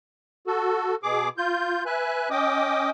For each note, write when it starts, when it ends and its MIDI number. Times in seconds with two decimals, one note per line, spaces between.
0.47 0.95 66
0.47 0.95 69
1.03 1.29 47
1.03 1.29 68
1.03 1.29 86
1.38 1.84 65
1.38 1.84 91
1.86 2.29 71
1.86 2.29 76
1.86 2.29 80
1.86 2.29 90
2.31 2.90 61
2.31 2.90 75
2.31 2.90 79
2.31 2.90 86
2.31 2.90 87